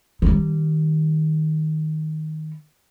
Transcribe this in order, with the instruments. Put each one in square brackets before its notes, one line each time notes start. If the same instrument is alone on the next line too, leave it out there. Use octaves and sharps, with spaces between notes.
[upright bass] D#3 G3